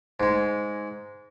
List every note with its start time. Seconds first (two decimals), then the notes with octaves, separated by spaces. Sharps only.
0.20 G#2 G#3